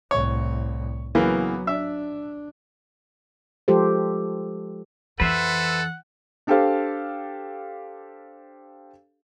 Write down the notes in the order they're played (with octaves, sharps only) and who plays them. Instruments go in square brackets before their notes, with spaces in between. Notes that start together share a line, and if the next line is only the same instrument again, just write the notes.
[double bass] C2 A2 [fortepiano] C#5
[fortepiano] C#3 E3 A#3 [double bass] F#3 B3
[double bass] D4 [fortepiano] E5
[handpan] F3 G#3 F4 G4 A4 C5
[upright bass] F2 E3 [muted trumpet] A4 [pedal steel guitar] B4 C5 E5 [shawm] F#5
[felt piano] D4 G4 A4 C5 F5